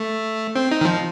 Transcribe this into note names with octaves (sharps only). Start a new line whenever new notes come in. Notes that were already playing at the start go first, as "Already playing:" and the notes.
Already playing: A3
C4
D#4
D#3
F3